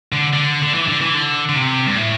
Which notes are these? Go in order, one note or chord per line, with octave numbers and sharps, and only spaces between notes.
D3
D3
D3
E3
D3
E3
D3
D3
C3
G2
A2